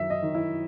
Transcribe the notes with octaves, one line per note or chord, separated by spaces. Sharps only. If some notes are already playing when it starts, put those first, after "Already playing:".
Already playing: F#2 D#3 E5
D#5
D#3
E4